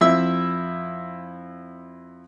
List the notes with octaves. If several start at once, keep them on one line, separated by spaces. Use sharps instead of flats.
F2 E4 E5 E6